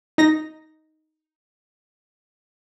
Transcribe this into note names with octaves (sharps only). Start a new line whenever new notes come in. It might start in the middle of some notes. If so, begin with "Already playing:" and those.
D#4 A#6